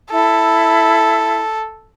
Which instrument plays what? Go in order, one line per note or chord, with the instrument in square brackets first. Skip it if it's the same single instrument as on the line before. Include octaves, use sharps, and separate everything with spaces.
[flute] E4 [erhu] A4